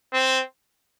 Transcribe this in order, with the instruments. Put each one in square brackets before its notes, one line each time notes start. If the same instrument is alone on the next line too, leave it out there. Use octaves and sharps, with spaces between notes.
[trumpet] C4